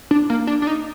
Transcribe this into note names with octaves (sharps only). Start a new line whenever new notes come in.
D4
A#3
D4
D4
D#4